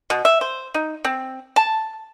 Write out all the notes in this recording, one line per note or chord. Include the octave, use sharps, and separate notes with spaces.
B2
E5
C5
D#4
C4
A5